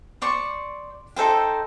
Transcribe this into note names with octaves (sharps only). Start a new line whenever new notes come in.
C5 D5 C#6
D#4 A4 C5 G5